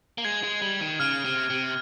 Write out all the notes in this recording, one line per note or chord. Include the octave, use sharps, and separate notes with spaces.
A#3
G#3 G#6
G#3
G3
D#3
C#3 F6
C3
C3